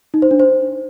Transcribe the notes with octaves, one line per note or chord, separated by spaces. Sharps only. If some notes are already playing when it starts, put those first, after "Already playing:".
D#4
C5
D4
C5